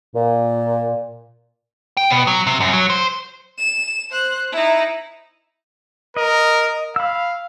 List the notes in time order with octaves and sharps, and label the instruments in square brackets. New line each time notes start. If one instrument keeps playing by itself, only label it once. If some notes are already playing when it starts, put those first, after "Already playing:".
[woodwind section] A#2
[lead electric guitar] G5
B2
F#3
C3
F#2
F#3
C5
[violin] E7
C5 F#6
D#4 E4
[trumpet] A#4 [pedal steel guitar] D#5
[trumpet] F5 [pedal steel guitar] B5 E6